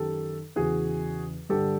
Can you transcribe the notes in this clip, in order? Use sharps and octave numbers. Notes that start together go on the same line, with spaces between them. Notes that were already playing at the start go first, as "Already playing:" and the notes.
Already playing: F#2 D#3 G4 A4
E2 C#3 E3 F#4 G#4
G2 D3 G4 A4